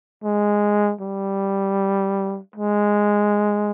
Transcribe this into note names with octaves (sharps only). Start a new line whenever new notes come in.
G#3
G3
G#3